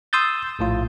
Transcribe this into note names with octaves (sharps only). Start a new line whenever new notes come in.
C6 D#6 E6 G6 A6
A#1 A2 F4